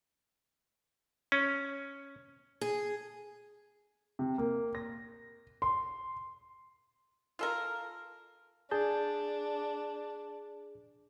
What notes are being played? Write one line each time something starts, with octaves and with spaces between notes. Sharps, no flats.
C#4
G#4
C3
A#3
A#6
C6
F4 A4 A#4
D4 G#4 A5 G6